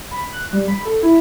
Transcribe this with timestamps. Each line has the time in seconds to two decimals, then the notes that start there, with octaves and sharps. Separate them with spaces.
0.11 B5
0.33 F#6
0.53 G3
0.68 B5
0.85 A4
1.03 E4